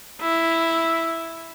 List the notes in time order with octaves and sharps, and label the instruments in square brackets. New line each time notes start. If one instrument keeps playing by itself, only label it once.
[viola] E4